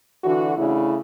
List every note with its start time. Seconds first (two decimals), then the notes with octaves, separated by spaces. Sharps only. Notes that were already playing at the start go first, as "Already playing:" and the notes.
0.24 D3 E3 D4 F#4
0.57 C#3 A3 D4 E4